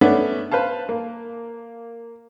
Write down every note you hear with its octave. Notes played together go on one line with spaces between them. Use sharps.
A3 B3 C#4 D4
B4 C5 F5 A5
A#3